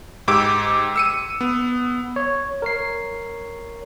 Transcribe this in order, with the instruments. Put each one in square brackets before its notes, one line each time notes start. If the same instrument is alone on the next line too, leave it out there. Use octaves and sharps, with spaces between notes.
[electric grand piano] G#2 G4 D6 E6 D7
E6 C#7 D#7
B3
[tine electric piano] C#5
A#4 C#5 C7